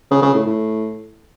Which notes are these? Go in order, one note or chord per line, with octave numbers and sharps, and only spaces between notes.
C#3
C#3
A2
A2